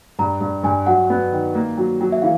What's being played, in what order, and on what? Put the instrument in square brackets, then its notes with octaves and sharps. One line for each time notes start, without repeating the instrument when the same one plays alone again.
[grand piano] G2 [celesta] A#5
[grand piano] G2
[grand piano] G2 [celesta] G#5
[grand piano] F#3 [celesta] F#5
[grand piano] B3
D#3
A#3
F#3
F#3
[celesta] E5
[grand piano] E3 [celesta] F5